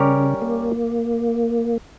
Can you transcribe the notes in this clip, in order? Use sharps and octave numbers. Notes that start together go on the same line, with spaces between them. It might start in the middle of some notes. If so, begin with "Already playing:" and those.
Already playing: C#3 G3 C#4 G4 A#4 C#5
A#3